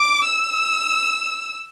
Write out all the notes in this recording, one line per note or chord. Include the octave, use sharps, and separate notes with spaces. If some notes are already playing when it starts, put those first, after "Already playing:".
Already playing: D6
E6